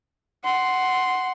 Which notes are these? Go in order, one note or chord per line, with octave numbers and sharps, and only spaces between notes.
F#5 C6